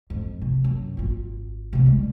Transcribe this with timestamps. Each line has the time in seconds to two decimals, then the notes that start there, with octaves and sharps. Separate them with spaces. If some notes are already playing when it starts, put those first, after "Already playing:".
0.10 F2 G#2
0.42 C3
0.64 F#2
0.97 G#1 F4
1.73 F#2 C3
1.86 G3 G#3